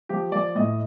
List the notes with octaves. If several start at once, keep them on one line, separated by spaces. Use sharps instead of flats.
F3 G4
F3 D5
A2 D#5